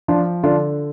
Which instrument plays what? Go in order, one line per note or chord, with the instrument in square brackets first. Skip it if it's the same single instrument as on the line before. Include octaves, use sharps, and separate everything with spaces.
[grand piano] F3 D4 F4
D3 D4 F4